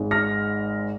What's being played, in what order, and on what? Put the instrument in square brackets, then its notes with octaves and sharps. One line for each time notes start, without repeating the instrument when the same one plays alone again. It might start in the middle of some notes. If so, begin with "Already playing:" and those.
Already playing: [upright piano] G#1 G#2 G#3
F6 A#6